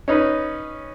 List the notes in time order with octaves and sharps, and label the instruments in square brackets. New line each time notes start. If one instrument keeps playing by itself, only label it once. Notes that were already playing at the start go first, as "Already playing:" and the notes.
[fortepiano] C#4 D#4 B4